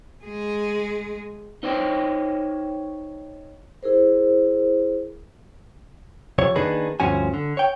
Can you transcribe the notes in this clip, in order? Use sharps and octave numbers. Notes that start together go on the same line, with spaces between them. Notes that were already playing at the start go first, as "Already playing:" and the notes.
G#3 G#4
D#4 C5 C#5 G5
E4 G#4 A#4 C5
F2 C3 C#5
D#3 A#3 D4 D#4 G#4 B4
D2 G2 F3 C#4 F#4 G#5
D3
C#5 G5